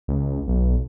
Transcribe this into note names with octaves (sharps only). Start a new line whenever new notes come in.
C#2
B1